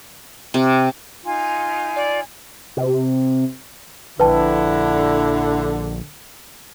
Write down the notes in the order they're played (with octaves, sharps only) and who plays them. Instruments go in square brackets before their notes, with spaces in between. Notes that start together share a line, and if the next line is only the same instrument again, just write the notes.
[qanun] C3
[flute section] D#4 F4 G#5
[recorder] D5
[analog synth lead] C3
[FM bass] A#1 [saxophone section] D3 [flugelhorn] E4 [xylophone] B4 G5 A5